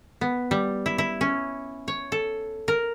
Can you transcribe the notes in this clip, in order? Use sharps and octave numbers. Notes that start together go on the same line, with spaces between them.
B3
G3
E4
E4
C#4
C#5
A4
A#4